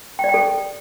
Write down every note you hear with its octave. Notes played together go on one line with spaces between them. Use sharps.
G5
D5
G5
A4